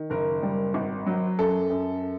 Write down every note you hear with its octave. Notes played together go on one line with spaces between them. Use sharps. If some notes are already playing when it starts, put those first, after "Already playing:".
Already playing: D#3
F#1 A#4
G3
G#1
F#3
F#2 A4
F#2